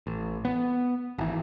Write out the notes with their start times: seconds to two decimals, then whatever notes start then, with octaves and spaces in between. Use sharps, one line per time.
0.07 A1
0.45 B3
1.18 G#1 E3